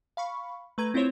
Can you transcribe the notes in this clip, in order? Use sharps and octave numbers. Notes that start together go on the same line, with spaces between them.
F5 B5 C#6
A3 B4 A#5 G#6
C4 E4 F4 C5 C#5